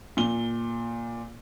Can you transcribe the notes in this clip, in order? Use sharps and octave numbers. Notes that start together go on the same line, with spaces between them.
A#2 G7